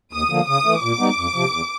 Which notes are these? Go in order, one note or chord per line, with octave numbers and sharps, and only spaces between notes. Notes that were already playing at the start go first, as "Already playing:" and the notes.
D#2 D#6
D3 F3 A#3
C#3 D#6
E3 A3
A#2 D6
G3 B3 D#4
F2
C3 F3
E2